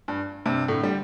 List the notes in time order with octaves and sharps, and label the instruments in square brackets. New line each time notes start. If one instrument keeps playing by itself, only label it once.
[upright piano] G2
G2 C3
A2 D3
D3 G3